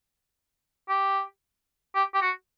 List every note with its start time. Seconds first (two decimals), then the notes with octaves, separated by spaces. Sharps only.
0.89 G4
1.95 G4
2.15 G4
2.22 F#4